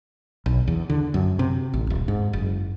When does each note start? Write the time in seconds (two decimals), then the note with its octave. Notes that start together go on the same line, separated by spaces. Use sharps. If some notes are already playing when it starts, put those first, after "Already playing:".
0.46 B1
0.68 E2
0.90 D3
1.14 F#2
1.39 C3
1.74 A1
1.90 D#1
2.08 G#2
2.33 F#1